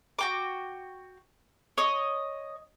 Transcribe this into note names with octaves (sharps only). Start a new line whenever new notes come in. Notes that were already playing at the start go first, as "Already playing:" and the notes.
F#4 G5 D6
C#5 D#5